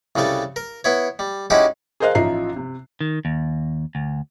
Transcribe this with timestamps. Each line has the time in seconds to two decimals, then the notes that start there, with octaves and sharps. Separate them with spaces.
0.16 C2 C#3 G3 A4 C#6
0.56 A#4
0.84 B3 E4 C#5
1.19 G3
1.50 G#3 C#4 D#4 E4 F#4 G4
2.00 G#4 A#4 C5 D#5 F5 F#6
2.15 A1 F3 D#4 E5 A#5 C7
2.56 C3
3.01 D#3
3.25 D#2
3.95 D2